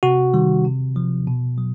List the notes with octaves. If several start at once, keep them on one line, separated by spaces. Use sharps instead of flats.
C3 F#4
D#3 G3
C3
F3
B2
F#3